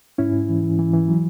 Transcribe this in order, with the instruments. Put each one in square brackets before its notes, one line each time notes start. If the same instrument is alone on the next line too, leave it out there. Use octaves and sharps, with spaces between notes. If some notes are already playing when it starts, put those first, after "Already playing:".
[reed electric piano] G#2 C#4 E4
G#2
E3
E3
E3
E3
F#3